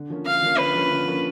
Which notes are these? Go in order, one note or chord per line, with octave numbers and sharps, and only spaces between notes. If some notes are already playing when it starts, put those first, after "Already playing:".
Already playing: D3
F3 A#3 C#4
D3 F5
F3 A#3 C#4
D3 B4
F3 A#3 C#4
D3
F3 A#3 C#4